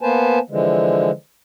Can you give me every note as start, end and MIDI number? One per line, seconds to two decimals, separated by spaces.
0.01 0.39 58
0.01 0.39 59
0.01 0.39 71
0.01 0.39 72
0.01 0.39 80
0.01 0.39 81
0.50 1.11 50
0.50 1.11 52
0.50 1.11 53
0.50 1.11 56